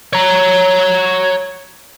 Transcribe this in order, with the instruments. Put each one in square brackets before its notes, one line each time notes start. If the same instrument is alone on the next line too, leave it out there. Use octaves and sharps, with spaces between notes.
[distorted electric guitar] C#5 A#5